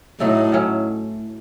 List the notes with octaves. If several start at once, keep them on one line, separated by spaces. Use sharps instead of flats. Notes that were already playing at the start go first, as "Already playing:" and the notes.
A2 F#3 A3 D#4
A2 F#3 C#4